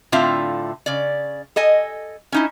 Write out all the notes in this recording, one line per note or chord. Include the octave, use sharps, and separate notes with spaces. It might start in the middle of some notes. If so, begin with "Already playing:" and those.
A2 D3 C4 F4 E5 F5
C#3 D5
A4 D#5 G#5
C#4 D#4 E4